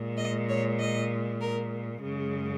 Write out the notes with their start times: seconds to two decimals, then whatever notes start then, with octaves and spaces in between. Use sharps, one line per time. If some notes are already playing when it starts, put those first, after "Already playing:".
Already playing: A#2 G#3
0.18 D#5
0.49 C#5
0.79 D#5
1.41 A#4
2.03 F#2 C#3 G#3